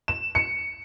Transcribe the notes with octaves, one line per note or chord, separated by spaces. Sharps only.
E7
C#7